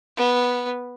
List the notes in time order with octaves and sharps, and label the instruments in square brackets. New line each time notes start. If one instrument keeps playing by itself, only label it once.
[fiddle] B3